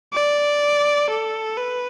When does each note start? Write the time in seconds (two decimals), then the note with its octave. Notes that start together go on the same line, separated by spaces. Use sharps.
0.13 D5
1.09 A4
1.57 B4